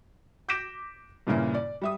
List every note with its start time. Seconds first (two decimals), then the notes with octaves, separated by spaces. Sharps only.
0.48 D6 G6 A#6 B6 D7 E7
1.27 G2 A#2 C#3 A#3 E4
1.54 D5
1.82 G3 E5 D#6